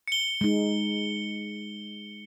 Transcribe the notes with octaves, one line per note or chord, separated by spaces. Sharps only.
C#7 G7
G#3 D#4